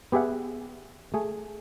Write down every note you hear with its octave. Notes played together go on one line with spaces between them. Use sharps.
B3 G4 G#4 E5 F#5
A3 G#4